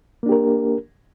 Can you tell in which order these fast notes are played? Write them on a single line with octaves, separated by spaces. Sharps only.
A#3 D4 G4 A#4